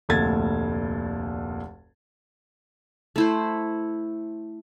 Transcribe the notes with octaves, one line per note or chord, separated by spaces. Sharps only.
F1 D2 A#2 A4 G#6 A6
A3 E4 C5